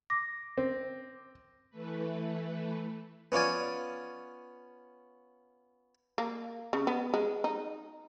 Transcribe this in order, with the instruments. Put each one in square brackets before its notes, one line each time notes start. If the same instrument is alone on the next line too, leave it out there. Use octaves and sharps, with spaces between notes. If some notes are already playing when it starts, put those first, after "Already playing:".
[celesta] D6 A#6
[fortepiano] C4
[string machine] E3 A3 B4
[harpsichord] B3 C#4 F4 D5 G#5
[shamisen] A#3
C#3
B3
G#3
D#4